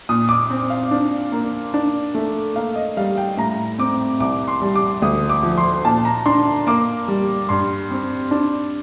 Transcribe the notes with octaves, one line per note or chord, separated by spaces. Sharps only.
A#2 D#6
D6
C4
F5
D4
A#3
D4
A3
A#3 F5
D#5
G3 F5
G5
A2 A#5
C4 D6
C2 D6
C6
G3
D6
D2 D#6
D6
F3
C6
A#2 A5
A#5
D4 C6
A#3 D6
G3
G2 C6
C4
D4